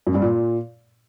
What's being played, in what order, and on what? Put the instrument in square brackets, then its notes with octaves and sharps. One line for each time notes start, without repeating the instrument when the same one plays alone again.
[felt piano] F#2
G2
A#2